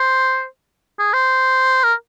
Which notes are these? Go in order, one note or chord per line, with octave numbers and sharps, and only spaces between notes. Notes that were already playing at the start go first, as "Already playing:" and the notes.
Already playing: C5
G#4
C5
A#4